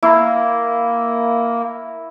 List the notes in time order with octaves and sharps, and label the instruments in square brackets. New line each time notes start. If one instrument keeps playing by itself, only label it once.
[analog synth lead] A#3 [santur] E4